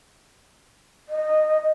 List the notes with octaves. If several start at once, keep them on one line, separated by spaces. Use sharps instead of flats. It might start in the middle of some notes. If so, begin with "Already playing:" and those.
D#5